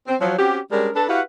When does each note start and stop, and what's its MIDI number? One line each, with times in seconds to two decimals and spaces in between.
0.07 0.15 60
0.20 0.34 53
0.20 0.34 54
0.38 0.58 60
0.38 0.58 61
0.38 0.58 66
0.38 0.58 67
0.72 0.89 55
0.72 0.89 56
0.72 0.89 61
0.72 0.89 62
0.72 0.89 70
0.95 1.05 62
0.95 1.05 69
0.95 1.05 71
1.09 1.21 64
1.09 1.21 66
1.09 1.21 67
1.09 1.21 71
1.09 1.21 77
1.09 1.21 78